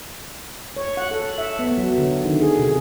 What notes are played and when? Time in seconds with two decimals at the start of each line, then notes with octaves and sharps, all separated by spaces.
0.76 C#5
0.97 F#5
1.11 A4
1.38 E5
1.59 B3
1.78 F#3
1.98 D3
2.24 D#3
2.41 G#4
2.59 C3